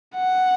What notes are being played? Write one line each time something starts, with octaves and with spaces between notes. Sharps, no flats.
F#5